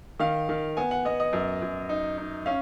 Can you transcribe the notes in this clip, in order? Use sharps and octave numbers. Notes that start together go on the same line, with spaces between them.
D#3 F5
D#3
B3 G#5
F#5
B3 D#5
D#5
F#2
F#2
D#4
D#4
C#4 F5